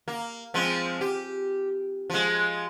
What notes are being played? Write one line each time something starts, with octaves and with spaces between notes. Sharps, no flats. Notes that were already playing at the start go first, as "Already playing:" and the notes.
A#3
F3 G#3 C4
G4
F3 G#3